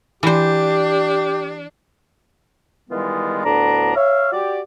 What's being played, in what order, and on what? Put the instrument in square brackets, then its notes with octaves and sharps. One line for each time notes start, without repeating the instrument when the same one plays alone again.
[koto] E3 C5 [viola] D4 [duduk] G4
[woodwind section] D#3 E3 G3 G#3 B3 F4
D2 A2 B3 D4 A#5
C#5 E5 F5
F#4 G4 D5